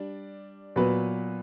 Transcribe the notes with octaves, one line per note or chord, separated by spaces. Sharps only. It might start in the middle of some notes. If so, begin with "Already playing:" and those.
Already playing: G3 D4
A#2 F#3 B3 F#4 B4